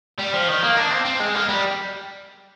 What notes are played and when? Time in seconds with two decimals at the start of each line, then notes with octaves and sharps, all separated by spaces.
0.19 G3
0.33 F3
0.48 D#3
0.62 A#3
0.77 D4
0.91 C4
1.05 C4
1.20 G#3
1.35 A#3
1.49 G3